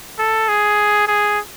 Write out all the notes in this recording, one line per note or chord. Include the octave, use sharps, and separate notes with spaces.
A4
G#4
G#4